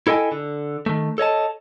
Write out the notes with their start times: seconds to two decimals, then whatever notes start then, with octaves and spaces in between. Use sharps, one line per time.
0.07 E4 A4 D#5 G5 G#5
0.32 D3
0.86 D#3 A3
1.18 A4 C#5 D#5 A5